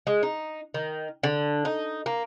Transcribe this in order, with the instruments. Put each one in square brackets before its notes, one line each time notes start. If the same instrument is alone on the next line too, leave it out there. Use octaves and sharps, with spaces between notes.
[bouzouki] G#3
D#4
D#3
D3
D#4
A#3